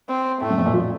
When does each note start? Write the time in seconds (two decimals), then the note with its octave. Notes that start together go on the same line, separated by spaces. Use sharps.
0.09 C4
0.41 A2 A3
0.50 F#2
0.58 F2
0.66 A#2
0.73 F3